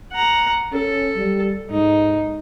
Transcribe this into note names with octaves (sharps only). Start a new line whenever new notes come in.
F#5 A#5
C#4 A4
G3
G#2 D#4